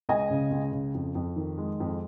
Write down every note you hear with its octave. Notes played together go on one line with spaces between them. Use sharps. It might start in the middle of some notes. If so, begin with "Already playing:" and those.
C#2 D#5 G#5
C#3
C#2
C#3
F2
F2
D#3
G#3
F2